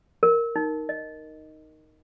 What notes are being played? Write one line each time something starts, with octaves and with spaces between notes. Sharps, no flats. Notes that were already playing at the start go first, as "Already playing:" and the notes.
A#4
D#4
D#5